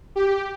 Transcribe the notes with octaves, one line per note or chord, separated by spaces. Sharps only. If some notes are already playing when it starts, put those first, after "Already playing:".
G4